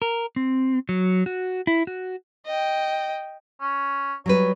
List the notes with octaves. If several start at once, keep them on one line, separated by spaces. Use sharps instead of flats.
A#4
C4
F#3
F#4
E4
F#4
D#5 G5
C#4
F#3 G3 B4 C#5